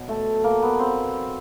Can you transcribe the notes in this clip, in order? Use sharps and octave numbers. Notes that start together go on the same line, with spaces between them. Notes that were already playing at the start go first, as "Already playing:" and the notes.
Already playing: B2 F#3
A3
A#3
B3
C4